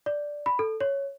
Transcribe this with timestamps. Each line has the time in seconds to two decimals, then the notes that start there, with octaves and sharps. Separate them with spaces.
0.06 D5
0.46 B5
0.59 A4
0.80 C#5